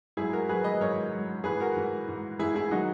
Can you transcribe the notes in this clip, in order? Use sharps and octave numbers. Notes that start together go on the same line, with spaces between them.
G#2 F#3 E4 G#4
F#4 A#4
G#2 F#3 G#4 B4
B4 D#5
G#2 F#3 A#4 C#5
G#2 F#3
G#2 E3 G#4 B4
F#4 A#4
G#2 E3
G#2 E3
G#2 E3 E4 G#4
E4 G#4
D#3 F#3 D#4 F#4